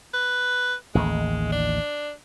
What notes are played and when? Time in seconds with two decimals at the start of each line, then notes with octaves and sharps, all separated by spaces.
0.14 B4
0.95 A1 D#2 D#3 G#3
1.52 D4